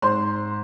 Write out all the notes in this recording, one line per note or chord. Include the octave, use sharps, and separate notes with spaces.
G#2 C5 C6